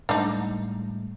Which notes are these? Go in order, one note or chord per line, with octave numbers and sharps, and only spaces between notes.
A2 G3 G#3 D4 D#4